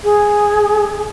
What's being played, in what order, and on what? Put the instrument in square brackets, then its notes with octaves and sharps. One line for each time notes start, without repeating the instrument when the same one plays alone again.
[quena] G#4